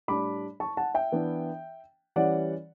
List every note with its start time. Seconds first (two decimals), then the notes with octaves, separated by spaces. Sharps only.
0.08 A2 G3 D4 B5 D6
0.60 A5 C#6
0.77 F#5 A5
0.95 E5 G5
1.12 E3 B3 D4
2.16 E3 G3 C#4 D5 F#5